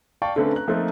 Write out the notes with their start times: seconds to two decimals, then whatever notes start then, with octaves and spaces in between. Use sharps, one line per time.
0.22 D5 F5 G5 A5 C#6
0.36 D3 A3 C4 C#4 A4 B4
0.52 A#5 F#6
0.68 F3 A3 A#3 C4 D#4